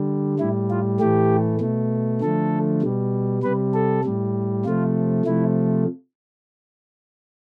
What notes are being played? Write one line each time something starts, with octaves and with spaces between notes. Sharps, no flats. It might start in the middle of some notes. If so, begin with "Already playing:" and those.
Already playing: D3 G3
A2 G3 E4
F4
A2 E3 A3 G4
B2 A3
D3 F3 A3 A4
B2 G3
C3 G3 B4
A4
A2 G3
C3 F3 A3 F4
C3 F3 A3 E4